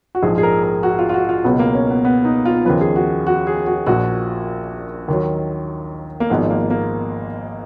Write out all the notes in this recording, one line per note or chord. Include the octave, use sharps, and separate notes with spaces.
F#4
A#1 G#2 F3 G#4
G#4
A#4
A#4
F#4
F4
F4
F#4
F4
C#2 B2 F#3 B3
A#3
C#4
B3
B3
D#4
F4
D#2 C#3 F3 B4
G#4
F#4
F#4
G#4
F#4
A#1 A#2 F3 F#4
D#2 D#3 F#3
A#3
G#1 G#2 F3 B3
A#3
A#3